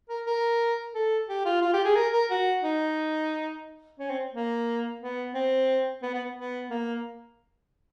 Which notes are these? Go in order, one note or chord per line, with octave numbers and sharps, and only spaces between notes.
A#4
A#4
A4
G4
F4
F4
G4
G#4
A#4
A#4
F#4
D#4
C#4
C4
A#3
B3
C4
B3
B3
B3
A#3